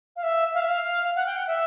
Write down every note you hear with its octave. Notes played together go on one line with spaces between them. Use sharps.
F5
E5
F5
E5
F5
F#5
G5
F#5
E5